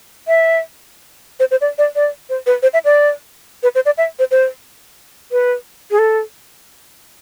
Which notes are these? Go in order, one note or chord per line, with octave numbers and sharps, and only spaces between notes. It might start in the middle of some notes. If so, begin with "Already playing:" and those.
E5
C5
C5
D5
D5
D5
C5
B4
C5
E5
D5
B4
C5
D5
E5
C5
C5
B4
G#4
A4